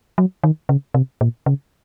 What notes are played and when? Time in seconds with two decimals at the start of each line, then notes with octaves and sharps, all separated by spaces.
0.18 F#3
0.44 D#3
0.69 C#3
0.94 C3
1.21 A#2
1.46 C#3